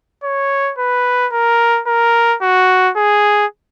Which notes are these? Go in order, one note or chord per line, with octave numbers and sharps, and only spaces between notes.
C#5
B4
A#4
A#4
F#4
G#4